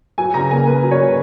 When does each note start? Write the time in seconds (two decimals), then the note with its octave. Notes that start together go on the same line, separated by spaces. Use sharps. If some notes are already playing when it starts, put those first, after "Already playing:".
0.18 F#3 G#5
0.34 C#3 A#5
0.51 A#3 G#5
0.67 A#3 B4
0.84 F#3
0.91 C#5
0.99 C#3
1.08 B4